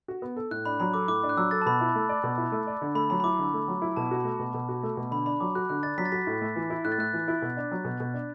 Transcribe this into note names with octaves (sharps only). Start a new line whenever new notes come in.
F#4
B3
A4
A2 F#6
D4 B5
F#3 B5
A4 D6
A2 D6
D4
F#6
F#3 E6
A4 A6
A5
B2 B5
E4
A3
D5
B2
E4
A3
D5
D3
A3 B5
F#3 B5
B5
E4 D6
D3
A3
F#3
E4
B2 A5
F#4
A3
B2
B2
F#4
A3
B2
D3 B5
D4 B5
F#3 D6
F#4 F#6
D3 F#6
D4 A6
F#3 B6
A6
F#4 B6
A2
A3
E3
E4
A2 F#6
A6
A3 F#6
E3
E4
B2
D4
F#3
B2
B2
D4